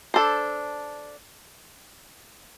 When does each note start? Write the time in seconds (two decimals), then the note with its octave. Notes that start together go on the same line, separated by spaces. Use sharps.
0.14 D4 A4 C5